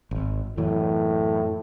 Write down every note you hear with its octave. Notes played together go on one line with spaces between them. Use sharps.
G#1
F#2 A2 E3